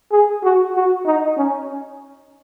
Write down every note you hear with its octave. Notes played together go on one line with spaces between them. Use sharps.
G#4
F#4
F#4
D#4
C#4